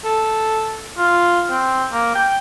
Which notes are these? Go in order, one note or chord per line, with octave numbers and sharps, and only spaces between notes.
A4
F4
C4
A#3
G5